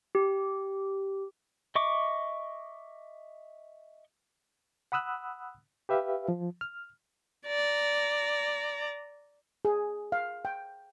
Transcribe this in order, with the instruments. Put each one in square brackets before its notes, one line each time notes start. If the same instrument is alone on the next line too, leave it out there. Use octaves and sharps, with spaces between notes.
[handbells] G4
[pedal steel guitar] D#5 E5 C#6 D6
[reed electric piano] F#5 B5 D#6 E6 F#6
G4 B4 E5 F5
F3
F6
[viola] D5 A#5
[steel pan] G#4
F5
G5